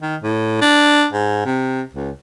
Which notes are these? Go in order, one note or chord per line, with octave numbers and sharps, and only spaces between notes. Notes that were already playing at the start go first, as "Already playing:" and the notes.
D#3
A2
D4
G#2
C3
C#2